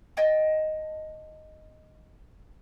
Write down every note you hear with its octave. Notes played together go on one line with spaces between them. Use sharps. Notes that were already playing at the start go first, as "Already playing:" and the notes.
D#5 G5 A5